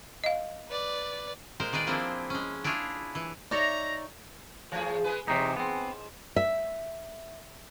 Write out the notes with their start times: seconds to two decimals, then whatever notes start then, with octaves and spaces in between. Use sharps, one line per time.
0.24 D#5 F5
0.69 B4 D5
1.60 A#2 G#3 A#4 C5
1.73 D#3 G#4 B4 D5
1.87 F3 A#3 C4 D4 E4
2.30 G#3 C#4
2.64 D4 E4 F4 G#4 C#5
3.15 E3
3.51 D#4 C#5 D5 E5 A#5
4.72 E3 F3 A3 G#4
5.04 G#3 G#4 B4
5.28 G#2 C3 E3 D#4
5.56 B3 C4
6.36 E5